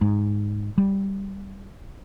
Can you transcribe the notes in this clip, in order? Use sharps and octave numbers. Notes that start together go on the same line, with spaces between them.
G#2
G3